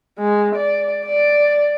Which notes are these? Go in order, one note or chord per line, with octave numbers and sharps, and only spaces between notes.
G#3
D5
D5